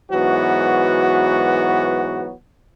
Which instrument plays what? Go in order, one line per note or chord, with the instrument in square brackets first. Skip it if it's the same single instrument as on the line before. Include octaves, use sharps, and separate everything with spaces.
[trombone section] G#2 E3 F#3 B3 F#4